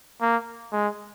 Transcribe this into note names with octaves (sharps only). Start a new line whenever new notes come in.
A#3
G#3